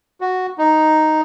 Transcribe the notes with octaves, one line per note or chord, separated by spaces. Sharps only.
F#4
D#4